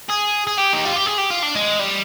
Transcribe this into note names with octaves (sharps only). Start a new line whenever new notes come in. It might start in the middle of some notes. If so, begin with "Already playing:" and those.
G#4
G#4
G4
D#4
F4
G4
G#4
G4
F4
D4
G#3
G3